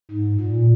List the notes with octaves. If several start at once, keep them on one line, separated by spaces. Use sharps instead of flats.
G#2
A#2